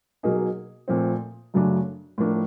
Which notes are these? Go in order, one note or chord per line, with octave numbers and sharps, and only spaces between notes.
B2 F#3 A#3 D#4 G#4
A#2 F3 A3 C4
F#2 C#3 F#3 A3 D4
A2 F3 A#3 D4